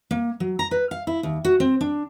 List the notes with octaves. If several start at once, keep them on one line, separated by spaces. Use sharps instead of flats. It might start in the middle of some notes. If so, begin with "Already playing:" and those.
A#3
F#3
A#5
B4
F5
E4
D#2
F#4
C4
D4